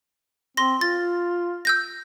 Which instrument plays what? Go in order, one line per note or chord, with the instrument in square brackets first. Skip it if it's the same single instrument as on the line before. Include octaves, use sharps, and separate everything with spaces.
[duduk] C4 [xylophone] C6 A#6
[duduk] F4 [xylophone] A6
[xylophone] E6 G6 A#6